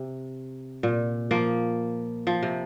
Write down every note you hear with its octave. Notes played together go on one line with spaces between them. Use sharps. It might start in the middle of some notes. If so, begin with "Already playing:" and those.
Already playing: C3
A#2
F3 A#3
F3
C3